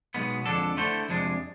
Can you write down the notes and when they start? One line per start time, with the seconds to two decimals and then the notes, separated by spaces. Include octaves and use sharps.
0.14 B1 B2 G#3 B3
0.46 F2 D3 G#3 D4 A4
0.77 D3 A3 E4 A4 C5
1.09 F2 C3 G#3 D4